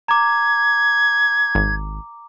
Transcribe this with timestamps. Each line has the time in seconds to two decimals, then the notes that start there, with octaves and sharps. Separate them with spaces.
0.08 A#5 D6 G#6
1.55 G#1